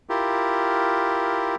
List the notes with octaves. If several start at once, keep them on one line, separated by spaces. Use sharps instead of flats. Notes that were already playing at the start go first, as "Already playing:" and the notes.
E4 F4 G4 A#4